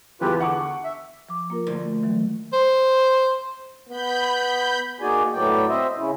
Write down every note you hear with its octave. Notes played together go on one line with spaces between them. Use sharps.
E2 E3 F4 G4 B4
D3 F#5 C#6 D6
E5
F3 D6
A#3 F4 A#4
D2
D#3 E3 F#3
C5
B3 B5 G6
A#3 D#4 F#4 G#4 D5 G#5
A2 F#3 B3 D5 G5
C4 C5 D#5 E5
C#3 C#4 E4